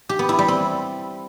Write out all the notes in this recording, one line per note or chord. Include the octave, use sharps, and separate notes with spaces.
G4
B3
E4
G3
C4